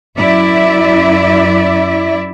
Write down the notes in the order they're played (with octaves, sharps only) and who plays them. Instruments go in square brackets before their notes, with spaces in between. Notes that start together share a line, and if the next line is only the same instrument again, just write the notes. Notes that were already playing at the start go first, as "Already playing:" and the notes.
[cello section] F#2 E4 D5 E5